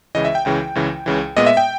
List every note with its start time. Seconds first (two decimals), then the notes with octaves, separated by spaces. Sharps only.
0.15 C#2 C#3 E3 D#5
0.25 E5
0.35 G5
0.45 C#2 C#3 E3 G5
0.75 C#2 C#3 E3
1.06 C#2 C#3 E3
1.37 A#2 G#3 B3 D#5
1.47 E5
1.57 G5